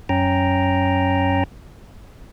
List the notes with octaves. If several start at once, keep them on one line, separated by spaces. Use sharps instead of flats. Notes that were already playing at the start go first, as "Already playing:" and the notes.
F#2 C#4 G5 A#5